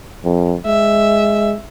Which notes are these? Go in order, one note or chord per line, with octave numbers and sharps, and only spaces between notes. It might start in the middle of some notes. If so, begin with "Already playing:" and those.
F2
G#3 E5